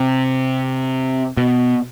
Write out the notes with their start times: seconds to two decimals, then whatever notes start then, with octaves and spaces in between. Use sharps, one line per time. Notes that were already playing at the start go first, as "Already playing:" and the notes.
Already playing: C3
1.37 B2